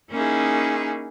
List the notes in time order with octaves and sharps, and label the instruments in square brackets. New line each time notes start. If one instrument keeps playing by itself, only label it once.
[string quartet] A#3 C#4 D#4 E4 G#4